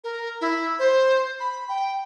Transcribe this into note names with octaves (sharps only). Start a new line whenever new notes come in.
A#4
E4
C5
B5
G5